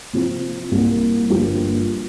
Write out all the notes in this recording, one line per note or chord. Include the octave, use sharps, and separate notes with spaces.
C3 F3 C4 F4
C2 A#2 A#3
G1 G2 F3 A#3 G4